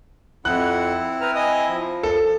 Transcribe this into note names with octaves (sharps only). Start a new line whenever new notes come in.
F2 C4 E4 F#5 F#6
B4 A#5 F6
D#5 G#5 D#6
F3
A4